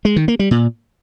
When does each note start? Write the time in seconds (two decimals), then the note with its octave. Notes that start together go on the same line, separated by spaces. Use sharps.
0.05 G#3
0.16 D#3
0.28 A#3
0.39 G3
0.51 A#2